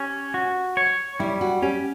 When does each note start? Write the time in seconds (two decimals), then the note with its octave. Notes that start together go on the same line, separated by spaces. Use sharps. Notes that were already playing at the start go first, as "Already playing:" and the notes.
Already playing: C#4 G4
0.34 F#4
0.77 C#5
1.20 G3 E4
1.41 F#4
1.62 C#4 G4